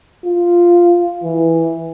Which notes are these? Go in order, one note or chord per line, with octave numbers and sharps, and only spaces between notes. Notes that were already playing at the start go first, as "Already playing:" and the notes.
F4
E3